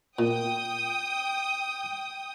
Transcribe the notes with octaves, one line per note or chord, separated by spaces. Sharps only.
A#2 G5 D#6